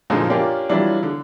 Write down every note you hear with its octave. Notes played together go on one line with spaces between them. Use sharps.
F#2 A#2 D3 F3 G#3 D#4
A#3 C#4 D4 F4 G4
E3 F#3 G3 D4 E4 F4
D3